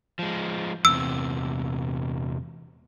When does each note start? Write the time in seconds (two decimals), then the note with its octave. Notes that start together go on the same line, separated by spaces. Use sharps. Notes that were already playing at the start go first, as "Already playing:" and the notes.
0.19 F3 G#3
0.85 E2 C3 E6